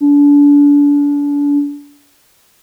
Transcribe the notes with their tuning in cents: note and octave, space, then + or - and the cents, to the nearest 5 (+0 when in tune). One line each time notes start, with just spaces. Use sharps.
D4 -35